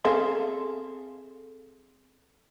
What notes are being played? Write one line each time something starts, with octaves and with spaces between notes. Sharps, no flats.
C4 G#4 A4 E5 F5 C6